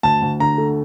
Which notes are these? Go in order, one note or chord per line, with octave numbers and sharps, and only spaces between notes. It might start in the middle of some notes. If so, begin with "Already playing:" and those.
D2 A5
D2
D3 A#5
A3